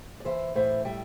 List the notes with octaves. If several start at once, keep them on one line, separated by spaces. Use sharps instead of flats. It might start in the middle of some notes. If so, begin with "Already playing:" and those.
D5
E3 C5 E5
A2 C5 E5
G3 E5 G5